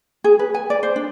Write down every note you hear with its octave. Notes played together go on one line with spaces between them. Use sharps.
G#4
B4
G#5
D5
C5
D4